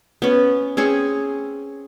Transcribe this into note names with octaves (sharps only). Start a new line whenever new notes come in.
B3 C#4
C4 C#4 G#4 C#6